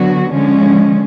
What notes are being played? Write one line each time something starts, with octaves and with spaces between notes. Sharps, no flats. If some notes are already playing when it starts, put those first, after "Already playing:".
Already playing: D3 F#3 B3 F#4
D3 F3 G#3 C#4